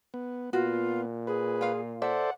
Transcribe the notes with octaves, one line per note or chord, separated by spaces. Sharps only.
B3
A#2 B3 F4 F#4
G#4 B4
F4 F5
A4 C5 D5 E5 F#5